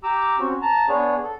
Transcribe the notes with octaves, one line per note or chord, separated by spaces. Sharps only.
G4 A#5 D6 E6
C4 C#4 F#4
A5 A#5
B3 D4 G#4 C#5
A4